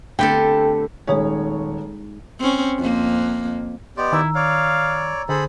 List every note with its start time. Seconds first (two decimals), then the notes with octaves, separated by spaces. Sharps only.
0.19 D3 A3 B3 C4 G4 A4 G5
1.08 D#1 G#3 D#4 G#4 C#5
2.39 C4 C#4
2.78 F2 A#3
3.97 B3 G4 D5 D#5 C6
4.12 D#3 E4 A#5 E6
4.35 C#5 D5 F5
5.29 D3 G#4 A4 C5 B5